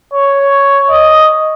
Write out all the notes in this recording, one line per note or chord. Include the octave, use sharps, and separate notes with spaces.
C#5
D#5